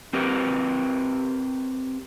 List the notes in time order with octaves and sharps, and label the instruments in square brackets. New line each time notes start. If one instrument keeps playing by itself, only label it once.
[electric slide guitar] C4 G4 A#4 B4